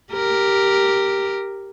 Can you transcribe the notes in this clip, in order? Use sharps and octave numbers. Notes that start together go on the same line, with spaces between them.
G4 A#4